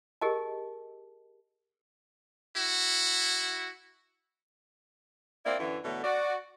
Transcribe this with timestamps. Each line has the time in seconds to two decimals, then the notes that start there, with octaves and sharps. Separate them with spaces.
0.21 G4 G#4 A#4 D#5 A5
2.56 E4 F#4
5.46 A#3 C4 E4 D5
5.59 F#2 D3 E3
5.84 B2 D3 E3 F#3 A3
6.04 F#4 D5